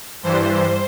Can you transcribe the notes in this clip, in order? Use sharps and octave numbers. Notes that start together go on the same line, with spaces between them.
G2 E3 G3 C5